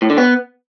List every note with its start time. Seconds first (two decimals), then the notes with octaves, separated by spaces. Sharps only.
0.02 A2
0.10 D3
0.18 B3